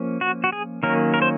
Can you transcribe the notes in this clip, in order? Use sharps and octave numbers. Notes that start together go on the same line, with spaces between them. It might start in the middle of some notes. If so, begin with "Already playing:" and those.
Already playing: F3 A#3 C#4
F#4
F#4
G#4
D#3 F#3 A#3 C#4 A#4
A#4
C5